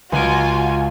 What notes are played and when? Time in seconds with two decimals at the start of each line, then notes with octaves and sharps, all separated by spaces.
0.12 C#2 F4 F#4 G#5 D7